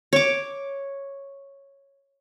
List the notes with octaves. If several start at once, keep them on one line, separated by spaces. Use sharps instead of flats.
C#5 D6